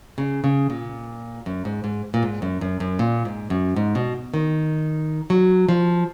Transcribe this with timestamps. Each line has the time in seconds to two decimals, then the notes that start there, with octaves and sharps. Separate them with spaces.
0.18 C#3
0.44 C#3
0.70 A#2
1.46 F#2
1.65 G#2
1.84 G#2
2.14 A#2
2.23 G#2
2.42 F#2
2.61 F#2
2.80 F#2
2.99 A#2
3.25 G#2
3.50 F#2
3.76 G#2
3.95 B2
4.34 D#3
5.30 F#3
5.69 F3